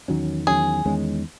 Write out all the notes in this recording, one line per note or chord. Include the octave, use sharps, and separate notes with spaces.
E2 D#3 F#3 C#4
E2 D#3 F#3 C#4 G#4
E2 D#3 G#3 C#4